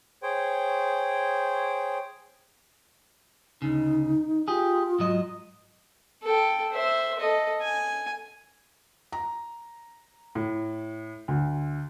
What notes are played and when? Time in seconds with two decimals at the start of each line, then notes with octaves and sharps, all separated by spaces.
0.23 G#4 C5 C#5 G5
3.62 D2 C#3 D#4
4.48 F4 G4 G#4
4.99 G#2 F#3 D#5
6.23 A4 G5
6.72 C5 E5
7.20 A4 D#5
7.62 G#5
9.12 A#5
10.35 A2
11.28 D2